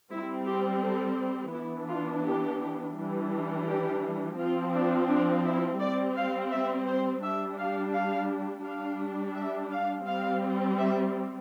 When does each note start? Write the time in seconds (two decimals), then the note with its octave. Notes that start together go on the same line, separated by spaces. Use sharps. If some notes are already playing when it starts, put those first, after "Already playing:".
0.11 G3 C4 E4
0.47 G4
0.82 A4
1.53 E3 B3 D4 E4
1.88 F4
2.25 G4
2.96 E3 G3 D4
3.67 G4
4.38 F3 C4 F4
4.74 D4
5.08 D4
5.45 E4
5.80 G3 C4 D5
6.16 F5
6.51 E5
6.87 C5
7.22 G3 D4 E5
7.58 F5
7.93 F5
8.64 G3 D4 F5
9.35 E5
9.71 F5
10.06 G3 C4 F5
10.78 E5